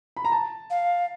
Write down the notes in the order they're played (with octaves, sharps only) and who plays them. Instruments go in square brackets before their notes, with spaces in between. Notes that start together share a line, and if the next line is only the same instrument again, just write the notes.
[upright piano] B5
A#5
A5
[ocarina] F5